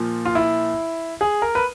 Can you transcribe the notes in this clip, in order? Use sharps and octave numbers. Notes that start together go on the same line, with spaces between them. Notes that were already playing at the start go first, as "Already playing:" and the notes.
Already playing: A#2 F3
F4
E4
G#4
A#4
B4